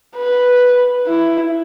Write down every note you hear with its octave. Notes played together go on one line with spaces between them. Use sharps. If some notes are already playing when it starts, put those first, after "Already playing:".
B4
E4